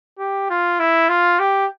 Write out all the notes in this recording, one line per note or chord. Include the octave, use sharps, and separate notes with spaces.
G4
F4
E4
F4
G4